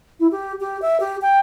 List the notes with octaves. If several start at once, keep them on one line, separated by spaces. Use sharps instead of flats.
E4
G4
G4
E5
G4
G5